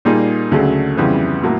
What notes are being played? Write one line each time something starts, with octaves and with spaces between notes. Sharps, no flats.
A#2 G3 A#3 D#4 G#4
D2 C#3 F#3 A3
F2 C#3 E3 G3 B3
A2 F#3 A#3